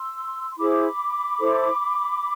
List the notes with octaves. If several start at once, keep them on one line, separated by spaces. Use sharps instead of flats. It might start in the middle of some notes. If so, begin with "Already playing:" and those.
Already playing: C6 E6
C6
E4 G#4 C5 B5 D6
E4 A4 C5